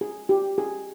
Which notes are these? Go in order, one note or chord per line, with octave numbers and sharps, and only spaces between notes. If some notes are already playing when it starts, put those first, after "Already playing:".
G#4
G4
G#4